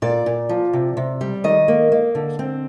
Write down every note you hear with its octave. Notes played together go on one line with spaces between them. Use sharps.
A#2 D5
A#2
F3
C3
C3
G3
D#3 D#5
A#3
A#3
D3
C4